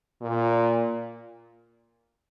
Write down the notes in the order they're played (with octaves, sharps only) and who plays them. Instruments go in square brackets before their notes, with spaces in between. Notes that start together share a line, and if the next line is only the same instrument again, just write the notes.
[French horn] A#2